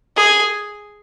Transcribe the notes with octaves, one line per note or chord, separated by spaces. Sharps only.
G#4